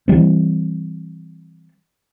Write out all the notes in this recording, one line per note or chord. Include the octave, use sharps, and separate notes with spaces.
E3 F#3 G3 C4